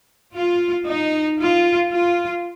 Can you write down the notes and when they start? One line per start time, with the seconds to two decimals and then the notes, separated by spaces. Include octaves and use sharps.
0.34 F4
0.86 D#4
1.39 F4
1.91 F4